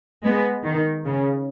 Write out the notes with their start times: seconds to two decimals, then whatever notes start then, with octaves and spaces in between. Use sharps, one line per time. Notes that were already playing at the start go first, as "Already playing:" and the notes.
0.24 G#3 B3
0.65 D#3
1.06 C#3